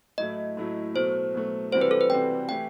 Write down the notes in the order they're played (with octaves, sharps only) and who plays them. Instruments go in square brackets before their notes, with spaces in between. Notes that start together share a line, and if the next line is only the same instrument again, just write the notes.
[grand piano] A2 F#3 A3 E4 [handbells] D#5
[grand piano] A2 F#3 A3 E4
[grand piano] B2 F#3 A3 [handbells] C5
[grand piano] B2 F#3 A3
[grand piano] C3 E3 G3 C4 F#4 [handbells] C5
[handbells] B4
A4
B4
[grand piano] C3 E3 G3 C4 F#4 [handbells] G5
[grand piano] E3 A3 E4 G4 [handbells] G5